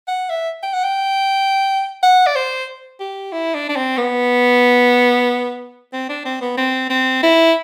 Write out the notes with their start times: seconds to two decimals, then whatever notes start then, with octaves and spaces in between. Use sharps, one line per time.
0.08 F#5
0.30 E5
0.63 G5
0.73 F#5
0.84 G5
2.03 F#5
2.27 D5
2.36 C5
3.00 G4
3.32 E4
3.55 D4
3.69 D4
3.76 C4
3.97 B3
5.93 C4
6.09 D4
6.25 C4
6.41 B3
6.57 C4
6.90 C4
7.23 E4